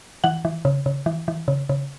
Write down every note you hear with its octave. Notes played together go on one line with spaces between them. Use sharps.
E3 F#5
E3
C#3
C#3
E3
E3
C#3
C#3